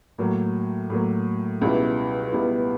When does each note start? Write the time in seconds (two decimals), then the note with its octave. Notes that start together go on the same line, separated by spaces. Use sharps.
0.18 A2 F#3 A#3
0.90 A2 F#3 A#3
1.61 C#2 B2 G3 B3 E4
2.33 C#2 B2 G3 B3 E4